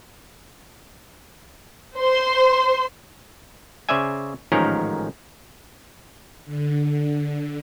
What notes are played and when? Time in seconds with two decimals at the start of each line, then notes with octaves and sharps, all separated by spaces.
1.98 C5 C6
3.89 C#3 C5 D5 E5 G#5
4.52 A1 G#2 D#3 F3 C#4 A#4
6.45 D3